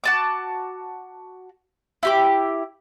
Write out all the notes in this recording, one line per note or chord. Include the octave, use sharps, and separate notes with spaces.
F#4 A5 D6
E4 G4 D6